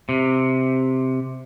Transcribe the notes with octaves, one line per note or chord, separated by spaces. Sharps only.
C3